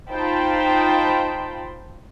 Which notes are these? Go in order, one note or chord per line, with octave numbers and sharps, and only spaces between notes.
D#4 F4 C5 G5 A5 B5